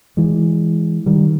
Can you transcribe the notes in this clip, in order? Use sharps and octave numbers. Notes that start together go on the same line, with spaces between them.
E3 G#3
D#3 G3